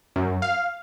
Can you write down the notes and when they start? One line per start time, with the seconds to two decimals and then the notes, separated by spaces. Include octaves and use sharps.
0.16 F#2
0.42 F5